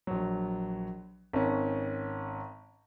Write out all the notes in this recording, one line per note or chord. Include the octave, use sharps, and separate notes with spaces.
A#1 F#3
G#1 C#4